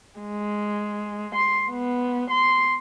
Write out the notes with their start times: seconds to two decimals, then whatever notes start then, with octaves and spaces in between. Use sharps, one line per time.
0.20 G#3
1.35 C6
1.70 B3
2.30 C6